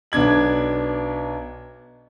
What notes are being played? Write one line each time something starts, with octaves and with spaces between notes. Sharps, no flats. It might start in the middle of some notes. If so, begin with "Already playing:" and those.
B1 B3 D4 G#6 F#7